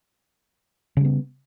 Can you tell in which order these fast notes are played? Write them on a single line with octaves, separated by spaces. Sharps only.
C#3 G3 B3